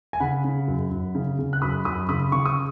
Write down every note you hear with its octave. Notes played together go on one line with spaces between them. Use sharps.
G#5
C#3 F#5 B5
C#3
F#2
F#2
C#3
C#3
F#6
F#2 B5 D#6
F#2 B5 D#6
C#3 B5 D#6
C#3 C#6
D#6